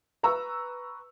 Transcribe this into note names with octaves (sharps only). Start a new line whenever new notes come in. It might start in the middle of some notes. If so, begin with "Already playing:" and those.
B4 A#5 C#6 E6